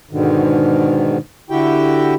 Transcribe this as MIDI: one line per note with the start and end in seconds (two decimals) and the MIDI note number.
0.11 1.18 44
0.11 1.18 47
0.11 1.18 50
0.11 1.18 51
1.50 2.14 50
1.50 2.14 64
1.50 2.14 66
1.50 2.14 67
1.50 2.14 79